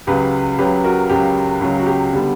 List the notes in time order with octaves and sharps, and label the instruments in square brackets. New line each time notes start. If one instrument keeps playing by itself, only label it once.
[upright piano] C#2 C#3 F#3 G4 B4
C#2 C#3 F#3 G4 B4
F#4 A#4
C#2 C#3 F#3 G4
C#2 C#3 F#3 F#4
F#4
G4
D3 G3 B3